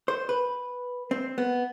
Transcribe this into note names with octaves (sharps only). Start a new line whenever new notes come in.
C5
B4
C4
B3